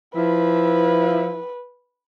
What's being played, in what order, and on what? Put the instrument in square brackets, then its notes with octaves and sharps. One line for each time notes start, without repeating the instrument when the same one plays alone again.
[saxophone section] F3 E4 [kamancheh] B4